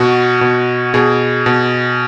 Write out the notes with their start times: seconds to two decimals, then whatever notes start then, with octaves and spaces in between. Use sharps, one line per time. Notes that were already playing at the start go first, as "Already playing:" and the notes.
Already playing: B2 F#4
0.41 B2
0.94 B2 G#4
1.46 B2